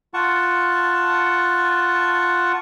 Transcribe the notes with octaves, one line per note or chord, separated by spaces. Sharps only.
F4 F#5 A5 C#6